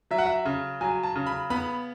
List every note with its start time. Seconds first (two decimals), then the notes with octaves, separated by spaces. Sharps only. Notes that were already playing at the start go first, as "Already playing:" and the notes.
0.11 F#3 E5
0.18 F#5
0.26 E5
0.45 C#3
0.81 F#3 G#5
1.03 A5
1.15 C#3
1.26 B5
1.50 B3 B5